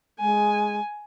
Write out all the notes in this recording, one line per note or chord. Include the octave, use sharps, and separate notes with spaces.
G#3 G#5